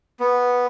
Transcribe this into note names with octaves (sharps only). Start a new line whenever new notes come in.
B3